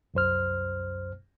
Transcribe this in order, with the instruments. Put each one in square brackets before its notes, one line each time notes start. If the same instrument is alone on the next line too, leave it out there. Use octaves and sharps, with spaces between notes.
[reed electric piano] C2 F#2 C5 F6